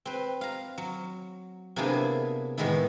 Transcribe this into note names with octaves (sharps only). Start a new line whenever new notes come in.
C4 B4
F5 A#5
F#3
C3 A#3 B3 D4 E4 G#4
A2 D#3 E3 G#3 B3 E4